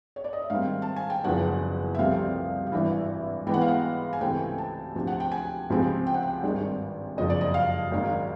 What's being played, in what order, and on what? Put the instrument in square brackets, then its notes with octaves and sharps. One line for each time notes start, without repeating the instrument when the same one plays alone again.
[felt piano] C#5
D5
D#5
E5
G#2 D#3 G3 C4 F5
A5
G#5
G5
F#1 E2 C#3 F3 F#5
E5
C2 C3 F3 A3 C4 F5
F5
G#1 G2 E3 E5
G#2 E3 G#3 B3 G5
F#5
F5
F#5
G#5
C#2 C3 E3 A3 C4 G5
G#5
A5
D2 C3 F3
F#5
G5
G#5
C#2 C3 F3 G#3 C4
G5
F#5
G5
G#1 G2 D#3 G#3 C4
F#1 F2 C#3 F3 D#5
D5
D#5
F5
G#1 G#2 D#3 F#3